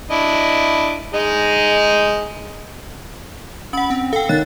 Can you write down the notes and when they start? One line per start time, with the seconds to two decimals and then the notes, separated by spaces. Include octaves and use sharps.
0.11 D4 E4 D#5
1.14 G#3 D#4 D#5
3.73 C#4 F#5 B5
3.90 C4
4.13 A4 F5 G5
4.29 D#3 C#5 F#6 A6